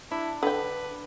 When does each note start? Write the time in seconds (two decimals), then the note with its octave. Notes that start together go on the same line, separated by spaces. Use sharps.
0.11 D4 E4
0.43 D3 B4 G5